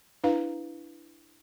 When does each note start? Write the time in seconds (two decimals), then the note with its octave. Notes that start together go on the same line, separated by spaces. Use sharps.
0.24 D4 E4 B4 F5 A#5